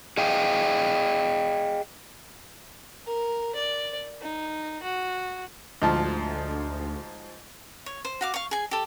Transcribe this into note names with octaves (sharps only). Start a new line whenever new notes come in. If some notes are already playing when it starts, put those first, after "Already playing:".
G#4 D#5 F5 G5
A#4
D5
D#4
F#4
D2 G#2 F3 A5
C#5
C5
F#4 F5 D6
F5 C#6
G#4 G#5
G4 A4